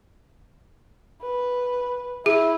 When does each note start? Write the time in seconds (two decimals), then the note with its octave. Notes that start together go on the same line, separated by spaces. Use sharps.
1.22 B4
2.26 E4 G#4